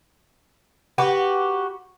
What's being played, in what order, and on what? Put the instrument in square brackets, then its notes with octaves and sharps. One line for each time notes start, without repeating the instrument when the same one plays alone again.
[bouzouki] F#4 G4 B4